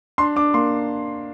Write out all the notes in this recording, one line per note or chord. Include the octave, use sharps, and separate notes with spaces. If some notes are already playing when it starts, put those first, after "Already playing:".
D4 C6
D4 D6
A#3 C6